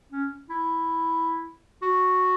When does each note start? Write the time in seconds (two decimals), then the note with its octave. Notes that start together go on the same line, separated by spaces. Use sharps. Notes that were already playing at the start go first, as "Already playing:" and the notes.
0.12 C#4
0.50 E4
1.82 F#4